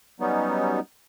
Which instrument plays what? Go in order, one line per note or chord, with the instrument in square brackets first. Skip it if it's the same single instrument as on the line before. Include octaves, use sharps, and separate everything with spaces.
[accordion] F#3 G3 B3 C#4 D#4